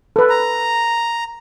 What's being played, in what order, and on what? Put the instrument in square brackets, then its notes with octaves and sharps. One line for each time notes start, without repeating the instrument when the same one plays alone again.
[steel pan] A4 B4
[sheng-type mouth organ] A#5